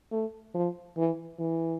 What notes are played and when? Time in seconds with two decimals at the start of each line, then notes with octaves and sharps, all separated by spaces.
0.12 A3
0.54 F3
0.97 E3
1.40 E3